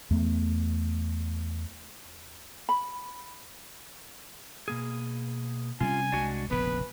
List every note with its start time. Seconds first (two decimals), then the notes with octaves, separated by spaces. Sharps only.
0.11 E2 A3
2.69 B5
4.68 B2 A#3 G#4
5.81 C3 G3 C#4 F4 G#5
6.12 C2 E3 G#3 D4 F#4
6.51 F1 A#1 C#3 B3 B4